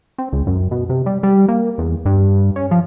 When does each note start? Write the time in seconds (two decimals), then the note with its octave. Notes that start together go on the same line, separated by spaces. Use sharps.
0.18 C4
0.32 C#2
0.47 F#2
0.71 B2
0.89 C3
1.06 G3
1.23 G3
1.48 A#3
1.78 E2
2.05 G2
2.56 C#4
2.71 F3